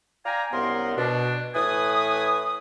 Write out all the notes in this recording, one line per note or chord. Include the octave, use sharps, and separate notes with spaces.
D5 F5 G5 G#5 A#5
C2 F#2 B3 A#4 C6
B2 D4
A2 E3 B4 G#5 D#6